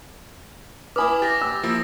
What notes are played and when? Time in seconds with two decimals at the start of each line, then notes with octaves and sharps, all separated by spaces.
0.96 E4 B4 G#5 B5 D6 D#6 F6
1.22 G4 A6 A#6
1.41 E6
1.64 F3 A#3 E4